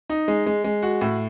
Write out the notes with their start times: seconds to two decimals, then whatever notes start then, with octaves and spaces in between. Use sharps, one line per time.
0.10 D#4
0.28 G#3
0.46 G#3
0.64 G#3
0.83 F#4
1.01 A2